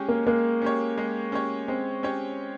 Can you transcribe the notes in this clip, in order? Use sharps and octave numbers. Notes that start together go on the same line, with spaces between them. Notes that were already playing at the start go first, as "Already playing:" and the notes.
Already playing: G#3 C#4 G4 C#5
A#3
G#3 A#3
C#4 G4 C#5
G#3
C#4 G4 C#5
G#3 C4
C#4 G4 C#5